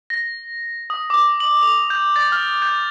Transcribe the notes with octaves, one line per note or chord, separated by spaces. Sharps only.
A#6
D#6
D6
F#7
F7
G6
A6
F6
G6